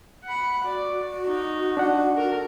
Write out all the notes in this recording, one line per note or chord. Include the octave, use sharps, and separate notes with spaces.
F#5 B5
F#4 D5
D#4
D4 F#5
A4 A#4